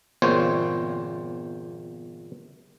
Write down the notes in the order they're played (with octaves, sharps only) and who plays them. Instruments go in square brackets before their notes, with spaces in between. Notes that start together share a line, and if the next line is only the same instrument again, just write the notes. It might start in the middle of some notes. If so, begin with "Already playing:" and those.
[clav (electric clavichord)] G1 E2 A#2 C4 C5 C#5